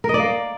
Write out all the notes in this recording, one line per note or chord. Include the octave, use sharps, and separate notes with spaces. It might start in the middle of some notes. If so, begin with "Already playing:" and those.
A#4
D#5
D5
A#3